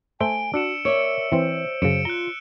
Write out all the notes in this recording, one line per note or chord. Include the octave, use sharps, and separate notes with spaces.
A3 C5 E5 G#5 D7 G7
D4 F#4 E6 C#7 E7
A#4 C#5 D5 E5 E6 C#7 D7
E3 C4 C5
F#2 C#3 C#7 D7 E7
F4 A#5 F#6 G7